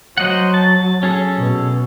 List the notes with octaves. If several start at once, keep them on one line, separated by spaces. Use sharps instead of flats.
F#3 C5 D#5 F#5
A5
C#4 G#4 A4
B2